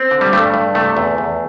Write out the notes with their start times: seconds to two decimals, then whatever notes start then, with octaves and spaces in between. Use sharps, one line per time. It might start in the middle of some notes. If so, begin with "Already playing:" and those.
Already playing: C4
0.11 D3
0.21 G3
0.33 G2 A3
0.54 G2
0.75 C3 A3
0.97 E2
1.18 E2